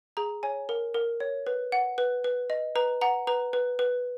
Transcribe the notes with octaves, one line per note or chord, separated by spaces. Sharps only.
G#4 A#5
C#5 G#5
A#4
A#4
C#5
B4
F#5
B4
B4
D#5
B4 A#5
F#5 A#5
B4 A#5
B4
B4